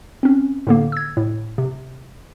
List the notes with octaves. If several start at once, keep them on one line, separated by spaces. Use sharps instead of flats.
C4 C#4
A2 D3 A#3
E6 G#6
A2
C3